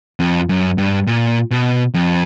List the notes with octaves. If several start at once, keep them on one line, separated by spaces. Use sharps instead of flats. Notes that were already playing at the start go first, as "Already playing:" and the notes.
F2
F#2
G2
A#2
B2
F2